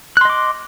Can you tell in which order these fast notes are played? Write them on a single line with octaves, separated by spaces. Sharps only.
F#6 C6 D#5 D6